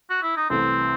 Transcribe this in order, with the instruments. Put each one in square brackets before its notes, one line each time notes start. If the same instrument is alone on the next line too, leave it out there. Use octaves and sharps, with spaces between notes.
[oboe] F#4
E4
D#4
[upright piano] C2 C3 E3 A3 [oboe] C4